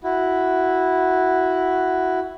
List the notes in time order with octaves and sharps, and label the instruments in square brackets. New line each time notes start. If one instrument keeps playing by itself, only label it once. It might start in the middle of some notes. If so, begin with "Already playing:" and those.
[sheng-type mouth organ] E4 F#4